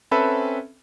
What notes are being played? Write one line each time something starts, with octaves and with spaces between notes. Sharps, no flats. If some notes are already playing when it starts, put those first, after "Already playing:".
C4 C#4 A4 B4 E5 B5